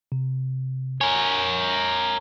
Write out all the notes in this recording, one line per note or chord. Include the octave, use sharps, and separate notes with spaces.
C3
A#4 C#5 G#5